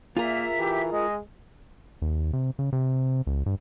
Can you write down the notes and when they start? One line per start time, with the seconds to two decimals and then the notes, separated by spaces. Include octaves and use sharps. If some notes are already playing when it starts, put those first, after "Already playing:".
0.17 A#2 A#3 F4 G#4 A#4 E5
0.59 E3 G4
0.92 G#3 D#5
2.02 D#2
2.33 C3
2.59 C#3
2.73 C3
3.27 C#2
3.46 G2